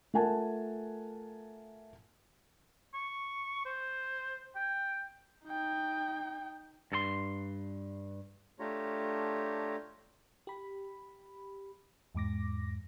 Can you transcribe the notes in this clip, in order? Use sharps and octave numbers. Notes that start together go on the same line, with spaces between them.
A3 F4 A#4 F#5 G#5 A5
C#6
C5
G5
D#4 G5
G2 A4 C6
A3 D4 F4 G4 C#5 A#5
G4 B5
E2 G#2 D6 A#6